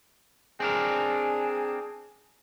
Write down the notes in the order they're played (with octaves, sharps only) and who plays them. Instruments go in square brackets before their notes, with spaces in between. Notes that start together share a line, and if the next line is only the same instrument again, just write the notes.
[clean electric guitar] C4 D4 A#4 [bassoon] G#4